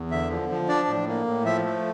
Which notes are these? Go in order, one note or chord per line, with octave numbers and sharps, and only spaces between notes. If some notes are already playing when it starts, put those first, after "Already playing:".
Already playing: E2
D3 E5
F3
F3
D4 D5
A2
A#3
A2
F3 E5
A3